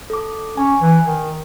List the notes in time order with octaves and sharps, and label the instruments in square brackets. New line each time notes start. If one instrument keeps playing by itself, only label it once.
[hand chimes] A4 D6
[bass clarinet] C#4 [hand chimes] G#5
[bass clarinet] E3
D#3